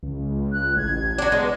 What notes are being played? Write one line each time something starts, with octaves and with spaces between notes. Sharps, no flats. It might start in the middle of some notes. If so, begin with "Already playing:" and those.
C#2
F#6
A1 G#6
F#3 D4
G#3 B3